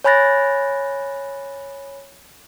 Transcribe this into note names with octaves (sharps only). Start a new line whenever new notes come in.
C#5 G#5 B5 F#6 A6 A#6